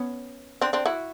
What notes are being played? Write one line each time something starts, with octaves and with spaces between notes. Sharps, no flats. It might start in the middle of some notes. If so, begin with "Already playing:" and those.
Already playing: B3 C#4
C4 D4
C4 D4
E4 F#4